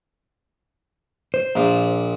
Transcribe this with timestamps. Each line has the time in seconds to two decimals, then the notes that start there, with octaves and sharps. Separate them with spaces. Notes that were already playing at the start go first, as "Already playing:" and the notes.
1.34 C5
1.56 A#1 A#2